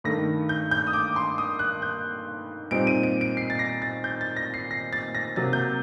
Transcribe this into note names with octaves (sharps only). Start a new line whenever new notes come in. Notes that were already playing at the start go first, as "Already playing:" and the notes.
G2 D#3 A3 A#6
G6
G6
D#6
D6
C6
D#6
F#6
G6
A#2 G3 C4 D#4 D7
D#7
D7
D7
C7
A6
A#6
A6
G6
A6
A#6
C7
A#6
A6
A#6
C3 F#3 A#3 A6
G6